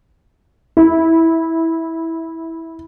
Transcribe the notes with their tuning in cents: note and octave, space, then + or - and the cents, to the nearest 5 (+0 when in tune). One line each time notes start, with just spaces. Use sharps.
E4 -15